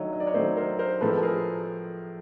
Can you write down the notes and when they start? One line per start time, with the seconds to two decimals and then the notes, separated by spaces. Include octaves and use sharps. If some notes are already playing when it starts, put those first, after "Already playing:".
Already playing: D#3 F#3 A3 C#5 D#5
0.13 D#5
0.20 D5
0.27 C#5 D#5
0.34 D#3 F#3 A3 C5 D5
0.57 A#4 C5
0.79 A#4 C5
1.01 A2 F3 G#3 A4 B4
1.17 A4
1.23 G#4 A#4